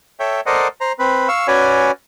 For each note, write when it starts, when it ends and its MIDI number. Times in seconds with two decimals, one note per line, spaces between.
0.20 0.41 69
0.20 0.41 73
0.20 0.41 76
0.20 0.41 79
0.46 0.68 69
0.46 0.68 70
0.46 0.68 72
0.46 0.68 74
0.46 0.68 75
0.46 0.68 78
0.81 0.92 72
0.81 0.92 82
0.99 1.28 60
0.99 1.28 71
1.28 1.47 77
1.28 1.47 85
1.28 1.47 88
1.48 1.91 61
1.48 1.91 66
1.48 1.91 71
1.48 1.91 73
1.48 1.91 74
1.48 1.91 80